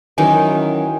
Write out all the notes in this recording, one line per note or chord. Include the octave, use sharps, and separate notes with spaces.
F#2 D#3 E3 D#4 G#5